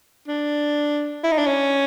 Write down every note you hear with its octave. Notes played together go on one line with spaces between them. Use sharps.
D4
E4
D#4
D4
C#4